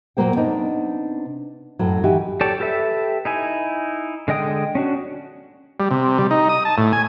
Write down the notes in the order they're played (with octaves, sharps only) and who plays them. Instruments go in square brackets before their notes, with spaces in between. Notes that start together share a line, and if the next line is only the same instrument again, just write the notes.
[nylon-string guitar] A#2 F3 F#3 A#3 C5 G5
C3 B3 D4 D#4
F#2 A2 F#3
D#3 E3 E4 F#4 G4
[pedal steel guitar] G4 A4 C#5 D5 A5
G4 A4 B4 E5
D#4 E4 G#5
D3 G#3 D#5 G5 D#6
C#4 D4 F#4
[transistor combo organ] G3
C3
G3
D#4
D#6
A5
A2
G#5